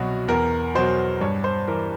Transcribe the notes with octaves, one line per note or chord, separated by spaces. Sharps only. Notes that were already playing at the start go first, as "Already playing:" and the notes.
Already playing: C2 B2 F#3 F#4
E2 A#4
B2 F#3 C5
G2 C#5
C5
E3 A#4